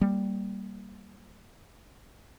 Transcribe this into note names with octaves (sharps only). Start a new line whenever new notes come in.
G3 A#3